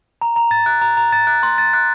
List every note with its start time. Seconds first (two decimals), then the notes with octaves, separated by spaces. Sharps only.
0.21 A#5
0.36 A#5
0.51 A6
0.66 F#6
0.81 A#5
0.97 A#5
1.13 A6
1.27 F#6
1.43 C6
1.58 A6
1.73 F#6